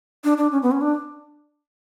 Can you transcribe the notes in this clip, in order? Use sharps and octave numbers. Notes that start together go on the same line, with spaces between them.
D4
D4
C#4
B3
C#4
D4